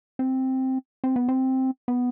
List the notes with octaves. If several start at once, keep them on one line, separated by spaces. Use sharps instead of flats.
C4
C4
B3
C4
B3